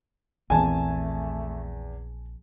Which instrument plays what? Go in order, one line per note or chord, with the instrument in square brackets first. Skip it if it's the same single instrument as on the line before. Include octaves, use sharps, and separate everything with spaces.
[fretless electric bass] A#1 C#3 C4 [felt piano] E2 [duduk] A3 [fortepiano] G#5 A5